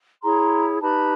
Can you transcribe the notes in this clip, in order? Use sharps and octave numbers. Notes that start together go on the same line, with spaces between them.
E4 G#4 C#5 A#5 C6
D#4 G4 B4 A5 B5